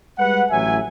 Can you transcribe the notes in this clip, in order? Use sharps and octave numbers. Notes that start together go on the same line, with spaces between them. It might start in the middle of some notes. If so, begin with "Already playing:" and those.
G3 G#3 B4 F#5
A1 A2 F#3 E5 G#5